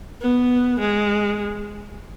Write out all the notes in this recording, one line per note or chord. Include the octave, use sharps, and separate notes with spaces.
B3
G#3